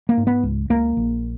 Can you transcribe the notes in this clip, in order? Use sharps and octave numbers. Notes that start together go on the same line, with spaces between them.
A#3
G#2
B3
C#2
C#2 A#3
A#1